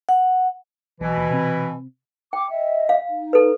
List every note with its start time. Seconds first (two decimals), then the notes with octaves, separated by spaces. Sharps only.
0.09 F#5
1.01 B1 B2 E3
1.17 D#2
1.30 C3 C4
2.33 G5 D6
2.51 D#5 E5
2.89 F5
3.09 D#4
3.33 A4 B4